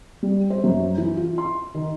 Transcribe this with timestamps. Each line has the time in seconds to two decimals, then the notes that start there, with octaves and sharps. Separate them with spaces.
0.23 G3
0.50 C5
0.64 F#2
0.98 E3
1.17 F4
1.38 C6
1.74 D#3